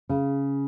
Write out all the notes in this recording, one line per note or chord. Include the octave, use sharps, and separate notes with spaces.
C#3